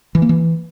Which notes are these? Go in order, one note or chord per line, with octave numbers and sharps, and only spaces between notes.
E3
A#3
E3